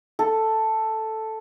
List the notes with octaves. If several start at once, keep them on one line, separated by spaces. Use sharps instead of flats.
A4